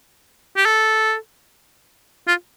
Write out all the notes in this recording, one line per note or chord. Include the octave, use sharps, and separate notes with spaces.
G4
A4
F4